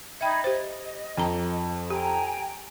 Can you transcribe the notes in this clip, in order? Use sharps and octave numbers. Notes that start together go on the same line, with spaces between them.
D#4 E5 G5 B5 G#6
G4 C5 D#5
F2 G5 A#5
G4 G5 G#5 A#5